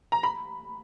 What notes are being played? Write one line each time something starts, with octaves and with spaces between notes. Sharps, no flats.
A#5
B5